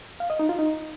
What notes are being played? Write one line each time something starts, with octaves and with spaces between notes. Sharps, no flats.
F5
D#5
D#4
F4
D#4